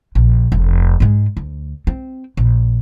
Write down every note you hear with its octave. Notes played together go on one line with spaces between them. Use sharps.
A#1
F1
G#2 G#3
D2
C4
A#1